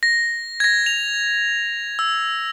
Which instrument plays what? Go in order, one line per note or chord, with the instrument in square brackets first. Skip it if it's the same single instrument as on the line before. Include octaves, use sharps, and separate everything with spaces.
[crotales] A#6
G#6 A#6
F7
E6